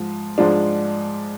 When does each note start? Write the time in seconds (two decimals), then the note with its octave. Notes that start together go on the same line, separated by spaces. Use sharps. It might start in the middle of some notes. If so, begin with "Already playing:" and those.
Already playing: G#2 F3
0.38 G#2 F3 G#3 D4